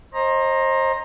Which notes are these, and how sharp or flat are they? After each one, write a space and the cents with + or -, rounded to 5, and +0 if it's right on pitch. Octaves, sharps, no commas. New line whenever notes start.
C5 +30 D#5 +0 A#5 +0